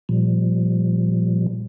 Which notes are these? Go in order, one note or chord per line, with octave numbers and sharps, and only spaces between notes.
A#2 F3 G3